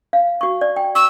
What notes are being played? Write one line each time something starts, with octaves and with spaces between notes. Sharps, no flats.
F5
F#4 C#6
D5
G5
C#6 E6